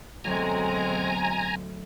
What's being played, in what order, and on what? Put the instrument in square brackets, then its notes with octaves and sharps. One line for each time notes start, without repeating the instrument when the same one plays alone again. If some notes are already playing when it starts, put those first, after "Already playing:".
[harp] D2 F#3 D4 [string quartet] B2 G#3 C4 [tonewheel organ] G#5 A#5